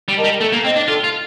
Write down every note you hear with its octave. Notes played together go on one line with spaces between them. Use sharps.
G3
A#4 D#5 A5
G3
A3 A4
A#3
C4 D#5 G5
D4
F4 A4
F4